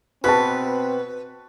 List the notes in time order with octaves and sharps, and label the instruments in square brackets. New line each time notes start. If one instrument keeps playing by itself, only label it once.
[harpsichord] B2 [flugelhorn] C4 [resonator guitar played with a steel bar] B4 [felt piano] A5 C#6 F#6